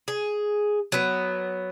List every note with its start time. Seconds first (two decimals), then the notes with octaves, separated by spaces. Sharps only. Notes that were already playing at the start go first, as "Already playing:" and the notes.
0.08 G#4
0.92 F#3 B3